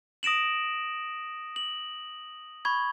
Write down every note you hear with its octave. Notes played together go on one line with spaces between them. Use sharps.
D#6 A#6 D7 E7 F#7
F#7
B5 C#6 G#6